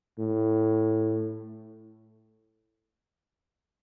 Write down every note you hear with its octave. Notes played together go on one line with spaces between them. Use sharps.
A2